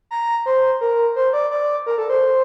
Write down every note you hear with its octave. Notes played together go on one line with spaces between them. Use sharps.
A#5
C5
A#4
C5
D5
D5
A#4
A4
C5